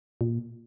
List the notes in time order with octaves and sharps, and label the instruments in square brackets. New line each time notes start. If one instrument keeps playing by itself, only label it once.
[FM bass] A#2